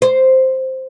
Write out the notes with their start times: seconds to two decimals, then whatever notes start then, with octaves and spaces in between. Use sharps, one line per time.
0.02 C5